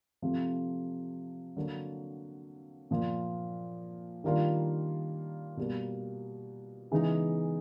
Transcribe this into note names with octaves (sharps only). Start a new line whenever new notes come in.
C3 F3 A3
D3 F#3 A#3
A#2 F3 A#3
D#3 G3 A#3 D4 F4
B2 G3 A#3
C#3 E3 G#3 B3 D#4